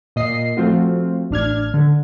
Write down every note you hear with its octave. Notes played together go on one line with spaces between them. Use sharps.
A#2 D#5 C7
F3 A3 C4 F4 F#4
A1 D4 F6 G#6
D3